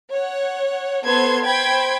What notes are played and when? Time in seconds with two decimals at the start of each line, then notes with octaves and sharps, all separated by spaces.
0.11 C#5 F#5
1.05 B3 A4 C5 C6 G#6
1.45 C5 G5 B5 G#6